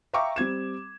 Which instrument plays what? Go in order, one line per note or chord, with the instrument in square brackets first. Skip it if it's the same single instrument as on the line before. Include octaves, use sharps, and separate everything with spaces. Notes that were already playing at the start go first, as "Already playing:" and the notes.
[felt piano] E5 F5 G5 A#5 C#6 D6
G3 C4 G#6 E7